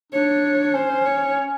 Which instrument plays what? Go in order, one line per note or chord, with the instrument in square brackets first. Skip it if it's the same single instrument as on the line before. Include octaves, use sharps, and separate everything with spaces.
[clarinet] D4 [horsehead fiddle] C#5
[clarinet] C#4 [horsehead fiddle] C5
[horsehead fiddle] C#5